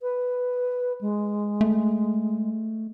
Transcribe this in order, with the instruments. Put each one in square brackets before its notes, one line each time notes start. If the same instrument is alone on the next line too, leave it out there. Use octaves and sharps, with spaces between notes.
[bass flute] B4
G#3
[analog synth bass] A3